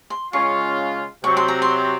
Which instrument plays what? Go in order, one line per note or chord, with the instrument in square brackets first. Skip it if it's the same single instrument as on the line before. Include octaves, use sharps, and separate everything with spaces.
[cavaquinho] C6
[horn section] C#3 G#3 C#4 F4 [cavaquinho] C#6
[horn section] C3 F#3 C4 [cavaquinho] C#6
[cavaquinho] C6
A#5
C6